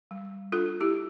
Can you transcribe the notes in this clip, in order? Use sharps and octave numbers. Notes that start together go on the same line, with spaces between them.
G3
D4 F4 A4
E4 G4